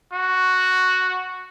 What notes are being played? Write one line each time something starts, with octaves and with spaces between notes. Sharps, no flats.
F#4